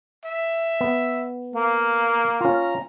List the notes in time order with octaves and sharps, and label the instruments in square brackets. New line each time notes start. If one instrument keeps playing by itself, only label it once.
[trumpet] E5
[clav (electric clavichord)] B3
[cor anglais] A#3 [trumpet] F5
[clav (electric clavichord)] C#4 F4 [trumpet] A#5